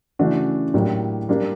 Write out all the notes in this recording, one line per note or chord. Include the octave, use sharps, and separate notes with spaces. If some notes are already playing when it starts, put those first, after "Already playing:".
C#3 E3 A3 D4 F#4
A2 F#3 A#3 D4 G4
G3 A#3 D4 G4 A#4